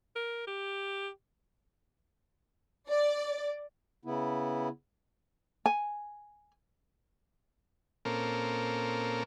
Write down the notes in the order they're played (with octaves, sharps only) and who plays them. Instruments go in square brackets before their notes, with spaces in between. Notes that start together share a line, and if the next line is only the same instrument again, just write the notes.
[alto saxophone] A#4
G4
[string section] D5
[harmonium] C#3 B3 E4
[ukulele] G#5
[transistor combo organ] A#2 A#3 C4 C#4 A4 A#4